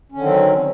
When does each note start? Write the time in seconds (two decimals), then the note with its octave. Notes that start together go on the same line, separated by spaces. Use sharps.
0.12 C#4
0.15 D3
0.18 D#3
0.22 C4
0.25 F#3